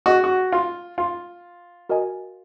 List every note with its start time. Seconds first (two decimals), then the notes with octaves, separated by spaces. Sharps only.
0.06 F#4 G#4 D#5 F#5
0.24 F#4
0.52 F4
0.98 F4
1.89 F#4 A#4 D#5 G#5